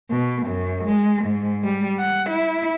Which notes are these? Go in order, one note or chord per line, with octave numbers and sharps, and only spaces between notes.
B2
F#2
G#3
G#2
G3
F#5
E4